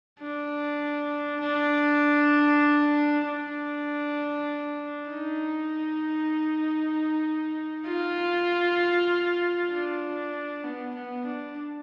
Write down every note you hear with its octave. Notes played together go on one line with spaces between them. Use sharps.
D4
D4
D4
D#4
F4
D4
B3
B3
D4